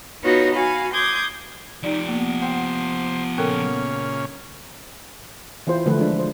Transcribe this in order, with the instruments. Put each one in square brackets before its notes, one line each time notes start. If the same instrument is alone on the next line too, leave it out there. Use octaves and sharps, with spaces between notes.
[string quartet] B3 D#4 F4 F#4 B4 C#5
F#4 F5 G#5 B5
C6 D6 D#6 G6 G#6
[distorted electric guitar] F3 G4 [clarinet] D#4 [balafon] D5
[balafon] A#3 [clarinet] B3
[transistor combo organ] C5 [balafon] F#5 G5
[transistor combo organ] A#2 C#3 C#4 [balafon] A4 A#4 G5
[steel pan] E3 E4 F4 C5
D3 F3 A3 B4
G#3 D4
C5